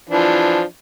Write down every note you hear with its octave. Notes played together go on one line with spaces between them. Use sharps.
E3 F3 D4